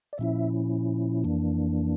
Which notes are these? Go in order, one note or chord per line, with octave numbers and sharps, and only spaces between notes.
D5
A#2 F3 C#4 E4 E5
F2 E3 A#3 D4